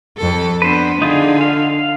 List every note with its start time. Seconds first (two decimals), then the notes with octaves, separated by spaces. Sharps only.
0.17 F2 A4
0.62 B3 D4 B4 C5
1.02 D3 D#4 F4 G#4
1.41 F5